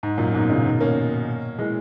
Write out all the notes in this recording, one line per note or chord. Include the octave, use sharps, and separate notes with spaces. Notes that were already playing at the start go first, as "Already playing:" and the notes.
G#2
F#2 A#2
G#2 B2
A#2 C#3
B2 D#3
A#3 C#4
E3 G#3